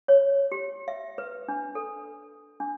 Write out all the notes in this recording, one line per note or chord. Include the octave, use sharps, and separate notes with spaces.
C#5
G4
E5
B4
D4
A4
D4